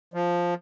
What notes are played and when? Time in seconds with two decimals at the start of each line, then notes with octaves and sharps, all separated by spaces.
0.14 F3